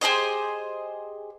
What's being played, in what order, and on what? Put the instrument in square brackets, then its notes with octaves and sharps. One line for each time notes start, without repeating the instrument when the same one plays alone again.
[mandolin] G4 G#4 C5 D#5